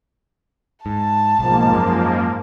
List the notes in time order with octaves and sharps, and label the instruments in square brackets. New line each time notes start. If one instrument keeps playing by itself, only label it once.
[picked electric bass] G#2 [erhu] A5
[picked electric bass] B1 [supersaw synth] G#2 F3 A#3
[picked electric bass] F#2